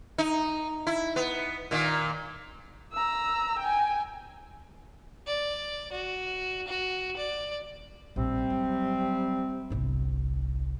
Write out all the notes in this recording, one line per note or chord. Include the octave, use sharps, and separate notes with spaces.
D#4
E4
B3
A#2 D#3
A#5 E6
G5 G#5
D5
F#4
F#4
D5
A#1 C3 G3 C4
F#3
G1 C2